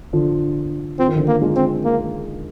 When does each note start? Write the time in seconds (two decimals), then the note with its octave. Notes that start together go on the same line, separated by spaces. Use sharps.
0.13 D3 F3
0.99 F3 C4
1.07 D#3
1.15 D3 F3
1.28 A#3
1.42 F3 G#3
1.56 C4
1.84 A#3